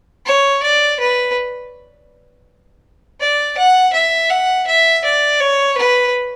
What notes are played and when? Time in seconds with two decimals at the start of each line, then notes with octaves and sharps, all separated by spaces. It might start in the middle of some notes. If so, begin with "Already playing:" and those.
0.26 C#5
0.63 D5
1.00 B4
3.21 D5
3.58 F#5
3.93 E5
4.30 F#5
4.67 E5
5.04 D5
5.40 C#5
5.78 B4